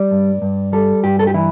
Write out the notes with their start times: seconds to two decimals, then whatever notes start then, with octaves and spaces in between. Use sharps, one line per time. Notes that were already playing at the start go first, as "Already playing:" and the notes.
Already playing: G3 D5
0.11 G2
0.42 G2
0.73 G3 A4
1.04 G2 G4
1.19 A4
1.27 G4
1.34 E3 E4